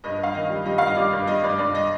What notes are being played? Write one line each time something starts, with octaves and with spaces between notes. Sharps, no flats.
G2 D#5
G2 F5
D#3 D#5
G3
G3 D#5
G2 F5
D#5
G3 D5
G2
G3 D#5
G2 D5
G2 D5
D#5